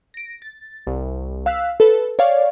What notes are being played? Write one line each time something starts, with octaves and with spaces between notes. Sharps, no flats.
A#6 D7
A6
C2
F5 E6 F#6 B6
A4 B4
C#5 D5 F5